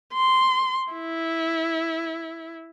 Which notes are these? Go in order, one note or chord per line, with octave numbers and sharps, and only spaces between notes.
C6
E4